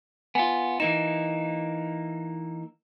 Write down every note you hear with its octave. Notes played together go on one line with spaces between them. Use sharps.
B3 F4 G#5
E3 A#3 D#4 E7